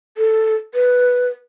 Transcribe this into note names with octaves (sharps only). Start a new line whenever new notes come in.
A4
B4